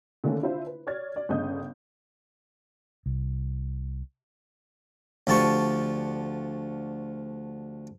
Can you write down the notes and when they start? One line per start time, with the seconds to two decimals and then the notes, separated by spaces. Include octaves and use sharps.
0.24 D3 D#3 A3 A#3 C#4
0.42 D4 E4 F4 C5
0.67 B4
0.87 C#5 D5 F6 G#6 A6
1.16 D5
1.29 G1 C#3 D4 D#5 D#6 G6
3.06 C2
5.27 D2 F3 G4 A5 C#6